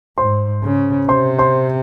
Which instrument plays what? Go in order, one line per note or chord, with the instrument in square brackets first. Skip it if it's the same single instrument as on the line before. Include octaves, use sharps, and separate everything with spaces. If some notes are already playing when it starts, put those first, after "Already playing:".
[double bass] G#2 [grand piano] C5 C6
[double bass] C#3
[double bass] C3 [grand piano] C5 C6
[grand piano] C5 C6